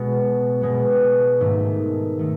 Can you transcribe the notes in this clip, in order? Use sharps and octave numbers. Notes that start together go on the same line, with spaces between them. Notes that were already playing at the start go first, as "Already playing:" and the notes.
Already playing: B2 G#3 B3
B2 G#3 B3
G#2 D#3 A3
D#3 A3